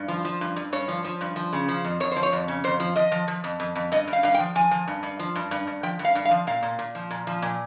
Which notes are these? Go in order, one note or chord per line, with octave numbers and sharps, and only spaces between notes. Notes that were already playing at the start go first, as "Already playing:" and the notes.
Already playing: G2
F3
F3
G2
G2
G2 C#5
F3
F3
G2
F3
C#3
F3
F2
F2 C#5
F3 C5
C#5
F2
C#3
F2 C5
F3
F3 D#5
F3
F3
F2
F2
F2
G2 D#5
G2
F5
G2 F5
G5
F3
F3 G#5
F3
G2
G2
F3
G2
G2
G2
F3 G5
G2
F5
G2
F5
F3
A#2 F5
A#2
A#2
F3
A#2
F3
A#2